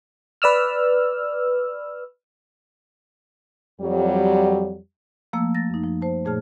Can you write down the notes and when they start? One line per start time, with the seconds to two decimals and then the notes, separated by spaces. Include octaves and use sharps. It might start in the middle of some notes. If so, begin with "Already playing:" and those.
0.42 B4 D5 E6 F6
3.80 F2 F#3 G3
5.33 F3 A3 A#3 E6
5.55 A6 A#6
5.70 F#2 D#4
5.84 F3
6.02 C5 A5
6.25 A#2 A3 G#4 C#5 A5 F6